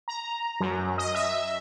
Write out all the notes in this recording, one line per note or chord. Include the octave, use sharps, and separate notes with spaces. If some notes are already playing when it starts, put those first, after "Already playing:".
A#5
F#2
D#5
E5